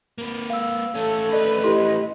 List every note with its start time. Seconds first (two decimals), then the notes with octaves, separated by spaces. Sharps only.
0.18 A#3 B4
0.50 F5 E6
0.95 A3 C#4 A4
1.33 A4 B4 D5 D#5
1.64 E4 G4 D#5 C6